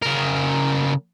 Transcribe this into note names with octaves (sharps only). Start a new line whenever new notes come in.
C#3 A#4